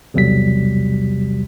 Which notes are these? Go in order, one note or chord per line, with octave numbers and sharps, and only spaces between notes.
B1 E2 C3 F#3 G3 B6